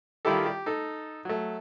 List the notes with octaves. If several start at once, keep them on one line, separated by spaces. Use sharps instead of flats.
D#3 G3 E4 F4 G4 A4
G4
D#4 A4
F#3 A3